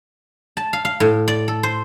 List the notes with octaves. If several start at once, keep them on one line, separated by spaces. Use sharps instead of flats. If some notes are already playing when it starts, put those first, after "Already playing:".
A5
F5
F5
A2
D5
A4
C5